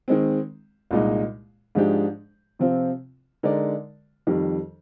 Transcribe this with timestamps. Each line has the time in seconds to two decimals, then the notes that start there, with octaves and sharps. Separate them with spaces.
0.08 D#3 G#3 C4
0.91 C2 A#2 G#3 D#4
1.75 G#2 F3 G#3 D4 G4
2.59 C3 F3 C4 F4
3.43 D3 G#3 D#4 A#4 D5
4.27 F2 D#3 G3